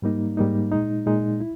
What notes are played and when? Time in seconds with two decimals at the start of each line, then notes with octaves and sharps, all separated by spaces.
0.02 G#2 G3 A#3 D#4
0.37 G#2 G3 A#3 D#4
0.72 A#2 G#3 D#4
1.06 A#2 G#3 D#4
1.40 E4